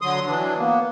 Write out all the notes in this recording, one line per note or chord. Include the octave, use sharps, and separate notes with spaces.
D3 F#3 C6 D#6
E3 F#3 D4
A#3 B3